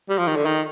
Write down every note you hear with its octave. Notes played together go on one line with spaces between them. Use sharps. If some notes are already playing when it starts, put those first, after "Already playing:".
G3
F3
D#3
D3
D#3